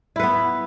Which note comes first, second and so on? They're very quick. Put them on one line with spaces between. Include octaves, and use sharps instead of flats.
E4 B4 B3